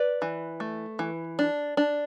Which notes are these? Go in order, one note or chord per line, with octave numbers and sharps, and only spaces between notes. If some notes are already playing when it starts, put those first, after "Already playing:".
Already playing: B4 D5
E3
A3
E3
D4
D4